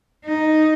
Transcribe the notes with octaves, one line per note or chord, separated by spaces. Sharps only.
D#4